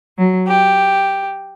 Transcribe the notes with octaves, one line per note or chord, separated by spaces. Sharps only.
F#3
G4